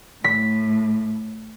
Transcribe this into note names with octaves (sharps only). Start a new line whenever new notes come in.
A2 B6